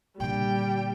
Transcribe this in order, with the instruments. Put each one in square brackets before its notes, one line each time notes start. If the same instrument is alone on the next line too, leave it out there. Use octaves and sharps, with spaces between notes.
[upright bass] A#2 D3 [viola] G3 [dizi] G5